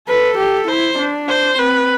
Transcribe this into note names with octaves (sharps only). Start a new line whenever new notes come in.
A4 B4
G4
E4 C5
D4
C5
C4 B4